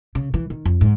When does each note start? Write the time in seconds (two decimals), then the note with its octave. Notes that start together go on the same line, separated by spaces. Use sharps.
0.15 C#3
0.34 E3
0.50 D#3
0.65 F2
0.81 G#2